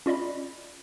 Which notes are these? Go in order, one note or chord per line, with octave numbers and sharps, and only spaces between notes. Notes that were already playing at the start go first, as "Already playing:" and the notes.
C#4 F4 D5 D#5 B5